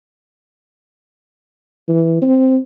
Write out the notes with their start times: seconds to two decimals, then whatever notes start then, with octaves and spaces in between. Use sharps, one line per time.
1.88 E3
2.22 C4